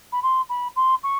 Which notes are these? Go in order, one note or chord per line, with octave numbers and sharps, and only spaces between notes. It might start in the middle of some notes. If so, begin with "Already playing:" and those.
B5
C6
B5
C6
C#6